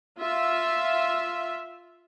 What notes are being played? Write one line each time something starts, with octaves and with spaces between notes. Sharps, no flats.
F4 E5